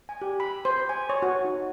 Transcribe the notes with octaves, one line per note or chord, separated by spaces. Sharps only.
G#5
G4
B5
C5
G#5
C#5
F#4
D#4